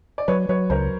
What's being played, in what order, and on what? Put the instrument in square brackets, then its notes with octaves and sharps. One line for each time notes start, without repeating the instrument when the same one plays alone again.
[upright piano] D5
[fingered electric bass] F#3 [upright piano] B4 C#5
[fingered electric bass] F#3 [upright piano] B4 C#5
[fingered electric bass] C#2 [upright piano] A#4 C5